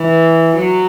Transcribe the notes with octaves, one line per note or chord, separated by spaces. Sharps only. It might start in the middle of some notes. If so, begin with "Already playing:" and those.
Already playing: E3
F#3